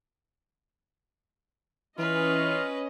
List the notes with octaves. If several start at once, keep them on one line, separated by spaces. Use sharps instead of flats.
E3 C#4 F4 B4 D#5